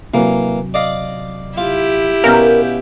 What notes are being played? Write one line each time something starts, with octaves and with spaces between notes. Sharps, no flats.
C3 E3 F#3 A#3
D5 D#5 F5
E4 F4 G4
B2 C#4 A#4 F5 G6